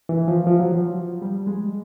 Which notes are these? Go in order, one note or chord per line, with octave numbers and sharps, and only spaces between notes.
E3
F3
F3
F#3
F3
G3
G#3